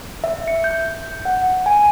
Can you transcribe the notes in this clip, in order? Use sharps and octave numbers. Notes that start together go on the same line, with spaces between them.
E5
C#7
G6
F#5
G#5